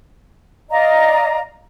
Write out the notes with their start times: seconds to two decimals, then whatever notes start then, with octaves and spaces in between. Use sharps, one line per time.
0.71 D5 D#5 F5 A#5